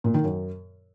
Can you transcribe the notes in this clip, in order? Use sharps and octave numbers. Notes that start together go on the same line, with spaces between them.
A#2
D#3
F#2